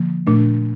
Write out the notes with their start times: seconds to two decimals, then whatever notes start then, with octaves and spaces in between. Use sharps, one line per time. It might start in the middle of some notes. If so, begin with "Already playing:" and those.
Already playing: D3 F3 A#3
0.27 A#2 A3 D4